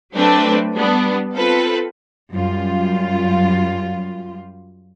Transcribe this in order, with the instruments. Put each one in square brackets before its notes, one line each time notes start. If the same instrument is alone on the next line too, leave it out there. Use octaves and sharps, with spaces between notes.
[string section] F#3 A3 C4 D4 B4
G3 B3 D4
C4 F4 A4 B4
[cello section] F#2 G3 F4